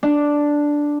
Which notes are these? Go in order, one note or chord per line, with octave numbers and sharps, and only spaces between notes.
D4